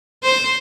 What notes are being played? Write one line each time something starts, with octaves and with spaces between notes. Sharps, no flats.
C5